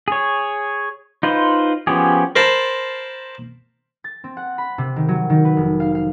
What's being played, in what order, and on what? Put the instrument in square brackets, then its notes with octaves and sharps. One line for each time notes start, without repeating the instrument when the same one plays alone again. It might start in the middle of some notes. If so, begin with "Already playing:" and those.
[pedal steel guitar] G#4 C#5
D#4 F4 B4 C5
F3 B3 C#4 G4 G#4
[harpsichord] A#4 C5 A5 B5 C6
[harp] A6
C4
F#5
B5
C3
D#3
F#3
D#3
B4
F1
F5
F5